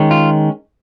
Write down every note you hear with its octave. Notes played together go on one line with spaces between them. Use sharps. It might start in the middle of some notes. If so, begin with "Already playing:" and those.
Already playing: D#3 G#3 C#4
F4